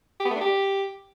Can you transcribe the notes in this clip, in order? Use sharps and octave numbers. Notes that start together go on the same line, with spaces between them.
G4
B3
A3
D4
G4